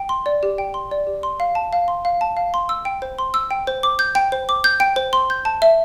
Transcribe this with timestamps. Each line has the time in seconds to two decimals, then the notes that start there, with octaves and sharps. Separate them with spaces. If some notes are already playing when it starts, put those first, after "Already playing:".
Already playing: G5
0.09 C6
0.26 D5
0.43 G4
0.58 G5
0.74 C6
0.91 D5
1.07 G4
1.23 C6
1.40 F5
1.55 A5
1.73 F5
1.88 C6
2.05 F5
2.21 A5
2.37 F5
2.54 C6
2.69 E6
2.85 G5
3.02 C5
3.19 C6
3.34 E6
3.51 G5
3.67 C5
3.83 D6
3.99 G6
4.15 G5
4.32 C5
4.49 D6
4.64 G6
4.80 G5
4.96 C5
5.13 C6
5.30 G6
5.45 A5
5.62 E5